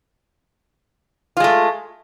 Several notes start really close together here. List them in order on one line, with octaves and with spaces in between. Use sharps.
F4 G#3 A3